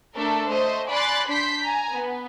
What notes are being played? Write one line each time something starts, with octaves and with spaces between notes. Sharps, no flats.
A3 D4 A4 A#4
A3 C5 D#5
D5 G#5 B5 C6 F#6 A6
D4 C6 G6 B6
G#5 A#5
B3